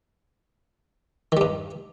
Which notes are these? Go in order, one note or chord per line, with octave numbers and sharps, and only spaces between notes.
G2 D#3 G3